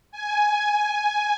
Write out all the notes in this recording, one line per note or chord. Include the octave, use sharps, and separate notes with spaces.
G#5